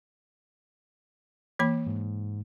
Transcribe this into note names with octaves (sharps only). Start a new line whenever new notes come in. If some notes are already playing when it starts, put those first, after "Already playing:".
E3 A#3 B5
G#2